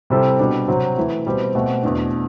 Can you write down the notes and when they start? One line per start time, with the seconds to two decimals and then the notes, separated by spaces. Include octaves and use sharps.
0.10 C3 G3 C4 E4 A4
0.39 B2 G3 D4
0.68 C3 F#3 C4
0.97 E3 A3 E4
1.26 B2 G3 C4 G4 B4
1.55 B2 A3 C4 F#4
1.83 E2 B2 A3 D4